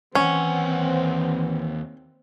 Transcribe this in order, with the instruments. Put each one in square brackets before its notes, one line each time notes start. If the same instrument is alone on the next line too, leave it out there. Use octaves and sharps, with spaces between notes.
[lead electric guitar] D#2 F#5 [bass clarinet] E3 [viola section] C4 [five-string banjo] C#4